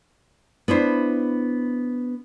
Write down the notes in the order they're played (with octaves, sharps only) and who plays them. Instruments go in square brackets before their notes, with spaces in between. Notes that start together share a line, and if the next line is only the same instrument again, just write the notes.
[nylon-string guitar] B3 D4 E4 C5